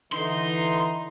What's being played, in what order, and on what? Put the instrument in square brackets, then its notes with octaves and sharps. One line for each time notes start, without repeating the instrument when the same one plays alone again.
[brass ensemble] D3 E3 D#4 [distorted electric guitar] C6